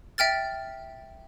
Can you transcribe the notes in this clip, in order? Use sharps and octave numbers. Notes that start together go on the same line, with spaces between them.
E5 G5 F6 A6